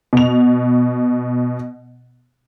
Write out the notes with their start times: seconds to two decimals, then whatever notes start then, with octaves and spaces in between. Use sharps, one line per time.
0.13 B2 F7